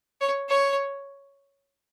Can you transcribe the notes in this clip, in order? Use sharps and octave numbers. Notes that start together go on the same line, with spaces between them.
C#5
C#5